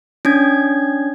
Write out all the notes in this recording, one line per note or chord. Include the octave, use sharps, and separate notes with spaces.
C#4 D4 G#6